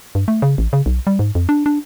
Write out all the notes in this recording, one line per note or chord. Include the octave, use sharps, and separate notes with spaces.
G2
A3
C#3
A1
C#3
B1
G3
G#2
F2
D4
D4